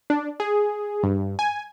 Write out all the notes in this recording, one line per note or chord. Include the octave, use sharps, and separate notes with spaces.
D4
G#4
G2
G#5